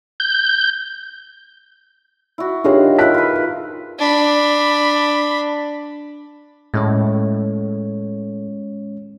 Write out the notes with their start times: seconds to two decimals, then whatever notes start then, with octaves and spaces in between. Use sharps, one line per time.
0.20 G6
2.38 E4 F#4
2.64 D#3 D4 F4 G4 G#4 C#5
2.99 E4 A#4 F#6 B6
3.14 F4 B4
3.99 D4 B5
6.74 A2 G#3 C#4 C#5